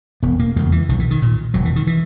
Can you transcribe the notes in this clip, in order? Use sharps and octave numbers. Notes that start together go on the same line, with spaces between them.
E1 B3
A#3
E2 C#3 G#3
E3
B1 D#3
E3
D#3
A#2
E1 F#3
E3
D#3
E3